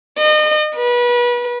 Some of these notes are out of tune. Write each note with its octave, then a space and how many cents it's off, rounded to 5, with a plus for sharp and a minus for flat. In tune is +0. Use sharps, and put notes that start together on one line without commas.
D#5 -35
B4 -30